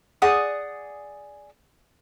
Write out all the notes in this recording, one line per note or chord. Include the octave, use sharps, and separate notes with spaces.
G#4 D5 F#5 D#6